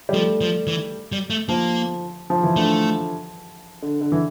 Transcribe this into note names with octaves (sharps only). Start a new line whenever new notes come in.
G3
F3 A3
F3
E3
G3
A3
F3 A#3
F3
E3
D3 A3
D3
D3
E3